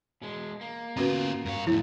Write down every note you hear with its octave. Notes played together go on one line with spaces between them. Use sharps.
B2 G#3
A#3
B3 C#4 F4 F#4 B4
G2 A#4 C#5 F5
B1 F2 A2 E4